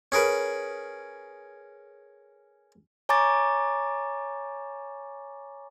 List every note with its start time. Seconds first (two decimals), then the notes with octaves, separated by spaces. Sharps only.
0.12 C#4 G#4 A#4 B4
3.09 C#5 G#5 A#5 C#6 D6 A6